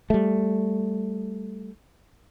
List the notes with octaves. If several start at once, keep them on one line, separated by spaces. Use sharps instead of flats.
G3 A3